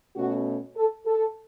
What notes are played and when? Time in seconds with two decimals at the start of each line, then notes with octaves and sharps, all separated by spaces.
0.16 B2 A3 C#4 F#4
0.76 A4
1.06 A4